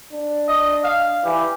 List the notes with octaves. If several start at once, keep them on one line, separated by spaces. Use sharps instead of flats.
D4
D#5
F5
E3 G4